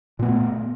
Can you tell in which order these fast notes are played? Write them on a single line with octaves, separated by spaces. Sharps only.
A#2 B3 A3